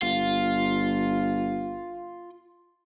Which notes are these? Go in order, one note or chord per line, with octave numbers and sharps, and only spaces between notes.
G1 F4